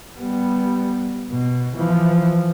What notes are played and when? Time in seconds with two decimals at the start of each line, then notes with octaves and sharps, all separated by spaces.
0.19 G3 B3
1.31 B2
1.77 E3 F3